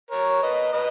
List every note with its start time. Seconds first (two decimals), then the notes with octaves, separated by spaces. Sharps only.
0.11 A#4 C#5
0.42 B4 D#5
0.73 B4 D#5